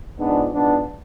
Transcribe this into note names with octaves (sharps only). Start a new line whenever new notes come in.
G#2 F3 B3 D4
G#2 F3 B3 D4